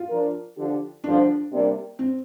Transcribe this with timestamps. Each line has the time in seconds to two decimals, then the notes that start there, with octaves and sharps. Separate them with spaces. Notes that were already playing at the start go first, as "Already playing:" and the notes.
Already playing: F4
0.10 F3 D4 A#4
0.56 D3 F3 D4 G4
1.04 G2 D3 F3 D4
1.52 C3 G3 A#3 D4
1.99 C4